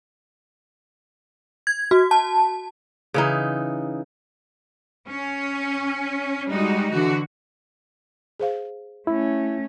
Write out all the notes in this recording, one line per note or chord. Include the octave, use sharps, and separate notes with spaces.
G#6
F#4
A5
C#3 E3 D#4
C#4
G3 G#3 D#4 F#4
D3 E3 F#4
G#4 C5 F5
A3 C#4 E4